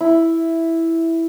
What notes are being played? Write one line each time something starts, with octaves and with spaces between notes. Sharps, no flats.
E4